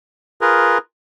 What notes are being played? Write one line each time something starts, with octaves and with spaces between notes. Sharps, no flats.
F4 G#4 A#4 B4